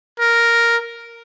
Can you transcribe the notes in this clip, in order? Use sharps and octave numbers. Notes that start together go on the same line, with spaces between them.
A#4